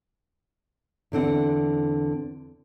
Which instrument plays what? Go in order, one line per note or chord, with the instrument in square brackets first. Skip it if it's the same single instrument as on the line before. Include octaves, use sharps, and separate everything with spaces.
[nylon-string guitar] E2 D3 C4 F#5